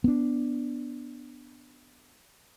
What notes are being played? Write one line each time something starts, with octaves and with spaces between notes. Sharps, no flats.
B3 D4